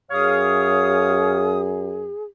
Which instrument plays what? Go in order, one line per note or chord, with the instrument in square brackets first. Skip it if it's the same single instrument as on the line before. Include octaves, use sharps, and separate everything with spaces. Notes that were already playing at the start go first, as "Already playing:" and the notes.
[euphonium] F#2 [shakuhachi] G#4 [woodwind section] C#5 F5 D#6